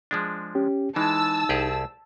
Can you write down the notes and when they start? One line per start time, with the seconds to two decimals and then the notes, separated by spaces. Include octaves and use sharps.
0.11 F3 G#3 D4
0.55 C#4 G4
0.96 E3 G#3 D#4 A5 E6
1.49 C2 G4 G#4